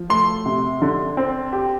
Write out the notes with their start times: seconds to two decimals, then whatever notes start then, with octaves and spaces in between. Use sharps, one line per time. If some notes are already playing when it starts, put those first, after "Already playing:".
Already playing: F3
0.10 A3 C6
0.46 C3
0.82 D3
1.17 C4
1.53 G4